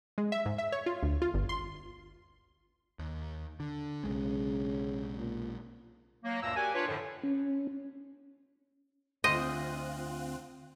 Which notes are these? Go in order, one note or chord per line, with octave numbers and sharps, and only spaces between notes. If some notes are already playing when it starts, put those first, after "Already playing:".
G#3
E5
G#2
E5
C#5
F4
D2
F4
G1
C6
D#2
D3
B1 C#3 G#3
A#2
F#3 A#3
D2 G2 A#2 A#3 A#5 E6
F#4 G4 A#4 D5 F#5 G#5
D4 F4 B4 C#5
F#2 A2 D3 F3
C#4
D2 C4 F4 C5 D#5 F#6